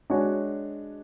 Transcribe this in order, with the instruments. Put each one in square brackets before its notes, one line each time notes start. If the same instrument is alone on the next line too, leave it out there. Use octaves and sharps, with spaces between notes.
[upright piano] G#3 D4 F#4 C#5